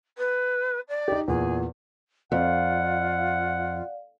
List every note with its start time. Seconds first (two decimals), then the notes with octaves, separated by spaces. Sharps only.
0.18 B4
0.89 D5
1.08 D#4 G4
1.28 E2 A#2 G#4
2.32 F2 F4 D5 F5 F#5